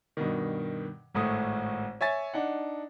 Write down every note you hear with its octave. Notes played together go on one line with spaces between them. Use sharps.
G2 B2 D#3
G#1 A2 A3 D#6
C#5 E5 G#5 A6
D4 D#4 F#5